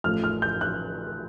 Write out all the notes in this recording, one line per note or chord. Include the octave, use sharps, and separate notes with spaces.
A1 A2 F3 A3 F6
F6
G6
F#6